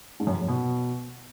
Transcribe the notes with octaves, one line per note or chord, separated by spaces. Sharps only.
G#2
F#2
F2
F#2
B2